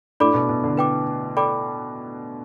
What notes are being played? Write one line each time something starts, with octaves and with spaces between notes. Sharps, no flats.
A2 D4 A4 D5 B5 D6
B2
B2
D3
B4 G5 D6
A4 D5 G5 B5 D6